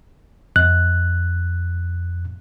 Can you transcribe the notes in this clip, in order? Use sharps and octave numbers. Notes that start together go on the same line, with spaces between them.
F2 F#6